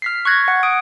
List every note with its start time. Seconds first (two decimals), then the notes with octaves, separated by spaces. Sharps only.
0.02 F6 B6 C7
0.25 C#6 F#6 G#6 A#6
0.48 F#5
0.63 D#6 D7